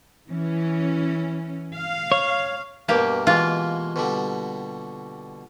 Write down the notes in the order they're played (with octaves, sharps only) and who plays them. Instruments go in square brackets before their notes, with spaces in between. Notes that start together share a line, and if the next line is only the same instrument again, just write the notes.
[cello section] E3 C#4
F5
[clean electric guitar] C#5
[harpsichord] G2 B2 [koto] A#3 G4
[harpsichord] B2 E3 G#3 [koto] F4
[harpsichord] B2 D3 G3